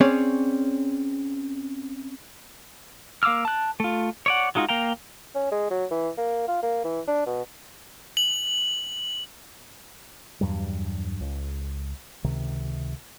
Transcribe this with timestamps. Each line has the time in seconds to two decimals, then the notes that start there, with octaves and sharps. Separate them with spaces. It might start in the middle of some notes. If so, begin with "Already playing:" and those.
0.01 C4 C#4 G#4 C#5 D5
3.23 A#3 F5 D6 E6 F6
3.45 A5 F#6
3.80 A3 F4
4.26 C#5 D5 F#5
4.55 F#3 G#3 D#4 F4 F#4
4.69 A#3 F5 G5 A#5
5.35 C#4
5.52 G#3
5.70 F#3
5.91 E3
6.18 A#3
6.48 F4
6.63 A#3
6.84 E3
7.07 D4
7.27 B2
8.17 F#7
10.41 E2 G2 F#3 G3
11.20 C#2
12.24 C#2 C3 D#3